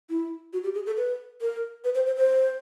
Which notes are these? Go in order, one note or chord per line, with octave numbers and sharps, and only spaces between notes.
E4
F#4
G4
G#4
A4
B4
A#4
B4
C5
C5
C5